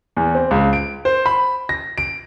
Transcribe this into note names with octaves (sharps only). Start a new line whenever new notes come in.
E2
C4
C#2
D7
C5
B5
A#6
D7